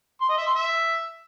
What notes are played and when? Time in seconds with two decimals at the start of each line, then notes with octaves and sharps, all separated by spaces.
0.21 C6
0.29 D#5
0.38 E5
0.47 C6
0.55 E5